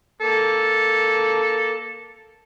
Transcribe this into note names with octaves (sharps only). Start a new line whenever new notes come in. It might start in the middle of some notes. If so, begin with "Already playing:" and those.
A#3 A4